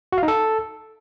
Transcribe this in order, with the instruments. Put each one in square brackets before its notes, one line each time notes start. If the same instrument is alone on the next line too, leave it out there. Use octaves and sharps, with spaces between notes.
[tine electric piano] F#4
F5
D#4
A4